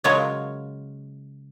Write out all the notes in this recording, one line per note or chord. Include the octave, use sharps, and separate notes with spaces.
C#3 F#3 G#3 F4 A#4 C#5